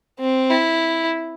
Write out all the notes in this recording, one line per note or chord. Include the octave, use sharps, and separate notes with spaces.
C4
E4